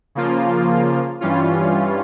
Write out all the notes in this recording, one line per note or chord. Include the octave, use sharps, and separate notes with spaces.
C#3 F3 A#3 F4
G2 E3 G3 C#4 F4